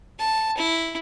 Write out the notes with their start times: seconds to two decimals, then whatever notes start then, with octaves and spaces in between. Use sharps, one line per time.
0.19 A5
0.57 E4